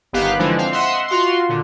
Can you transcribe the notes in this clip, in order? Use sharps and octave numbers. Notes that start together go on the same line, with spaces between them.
G1 D#3 B3 G4 F5 F#6
D3 E3 F3 G#3 D4
C4 F5
D#5 E5 F#5 C6
F4 F#4 F5 C6
A#2 D3